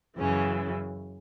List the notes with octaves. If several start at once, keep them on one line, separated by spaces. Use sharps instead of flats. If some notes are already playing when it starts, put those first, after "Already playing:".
F#2 C#3 E3 C#4